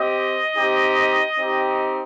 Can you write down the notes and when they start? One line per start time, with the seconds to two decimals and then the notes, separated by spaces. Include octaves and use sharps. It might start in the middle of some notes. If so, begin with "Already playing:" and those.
Already playing: C4 G4 D#5
0.56 C4 D#4 G4
1.37 C4 D#4 G4